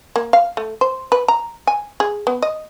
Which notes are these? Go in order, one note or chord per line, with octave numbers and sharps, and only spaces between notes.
A#3
F5
A3
C5
B4
A#5
G#5
G#4
B3
D#5